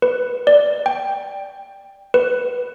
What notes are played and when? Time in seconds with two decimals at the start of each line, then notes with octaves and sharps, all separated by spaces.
0.02 B4
0.47 D5
0.86 G5
2.14 B4